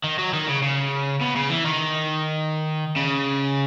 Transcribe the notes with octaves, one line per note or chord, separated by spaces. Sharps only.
D#3
F#3
D#3
C#3
C#3
B2
C#3
E3
D#3
C#3